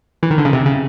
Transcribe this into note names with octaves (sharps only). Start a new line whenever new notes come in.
E3
D#3
D3
C#3
C3
C#3